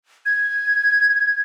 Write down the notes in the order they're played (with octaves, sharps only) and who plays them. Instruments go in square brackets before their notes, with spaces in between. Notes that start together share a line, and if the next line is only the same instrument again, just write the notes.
[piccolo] G#6